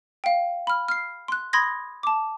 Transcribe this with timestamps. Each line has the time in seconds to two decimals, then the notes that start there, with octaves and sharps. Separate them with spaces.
0.24 F5 G5
0.67 B5 F6
0.88 F6 C7
1.28 C6 F#6
1.53 B5 C6 D#6 G#6 A#6
2.03 A5 D6